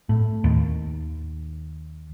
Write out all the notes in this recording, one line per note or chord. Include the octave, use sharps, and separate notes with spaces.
A2
D#2